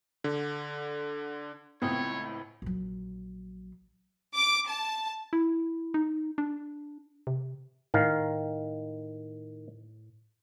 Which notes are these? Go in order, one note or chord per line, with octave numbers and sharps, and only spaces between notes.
D3
C#2 A2 B3 C4 C#5 G5 D#6
A#1 F#3
D6
A5
E4
D#4
D4
C3
A2 D#3 F5